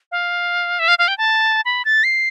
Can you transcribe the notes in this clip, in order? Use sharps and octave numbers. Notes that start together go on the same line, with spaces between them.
F5
E5
F5
F5
G5
A5
B5
A6
C7